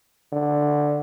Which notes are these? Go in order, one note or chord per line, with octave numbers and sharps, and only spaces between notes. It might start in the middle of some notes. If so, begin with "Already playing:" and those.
D3